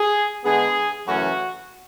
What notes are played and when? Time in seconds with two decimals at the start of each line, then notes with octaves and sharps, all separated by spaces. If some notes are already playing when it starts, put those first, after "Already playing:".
Already playing: G#4
0.45 D3 G#3 B3 G#4
1.07 F#2 C#3 E3 A3 C#4 F#4